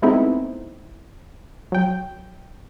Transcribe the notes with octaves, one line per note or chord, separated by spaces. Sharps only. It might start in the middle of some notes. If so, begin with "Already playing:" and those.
G#3 A3 B3 C4 D#4 E4
F#3 G5